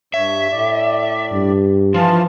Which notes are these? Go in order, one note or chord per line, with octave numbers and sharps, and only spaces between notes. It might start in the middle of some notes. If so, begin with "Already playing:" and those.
G2 C#5 E5
A2 D5
G2
E3 F3 F4 A5